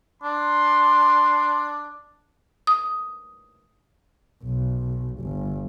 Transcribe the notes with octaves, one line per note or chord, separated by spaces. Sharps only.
D4 C6
D#6
B1
G1